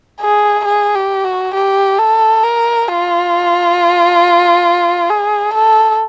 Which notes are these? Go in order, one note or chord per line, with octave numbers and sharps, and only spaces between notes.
G#4
G#4
G4
F#4
G4
A4
A#4
F4
G#4
A4